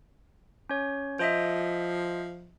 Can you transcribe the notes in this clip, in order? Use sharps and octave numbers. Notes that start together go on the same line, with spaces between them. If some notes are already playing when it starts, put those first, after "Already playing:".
C#4 C#5
F3 C5 D#5 E5